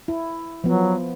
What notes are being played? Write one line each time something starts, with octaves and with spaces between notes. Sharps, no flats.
E4
F3 F#3 B3